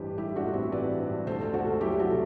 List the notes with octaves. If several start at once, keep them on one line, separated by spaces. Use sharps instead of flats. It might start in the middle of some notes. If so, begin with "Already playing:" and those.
Already playing: A1 G2 E3 G4 B4 C5
G3 E4 G4
D4 F#4
A1
C4 E4
E3 B4 D5
G2
D2 A4 C5
D2 F#4 A4
F#3 E4 G4
F#4 A4
C3